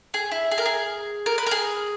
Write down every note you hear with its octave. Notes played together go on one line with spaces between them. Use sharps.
G#4
E4
G#4
A#4
G#4
A#4
B4
A#4
G#4